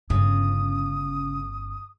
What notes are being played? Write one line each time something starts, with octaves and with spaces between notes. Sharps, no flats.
G1 C#3 C#4 D#6